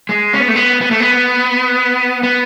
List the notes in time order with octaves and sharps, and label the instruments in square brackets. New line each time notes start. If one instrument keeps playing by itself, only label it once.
[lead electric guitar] G#3
C#4
B3
A3
B3
B3
A3
B3
B3